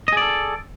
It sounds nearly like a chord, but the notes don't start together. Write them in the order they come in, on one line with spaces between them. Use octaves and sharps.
D#5 G#4 D5 A4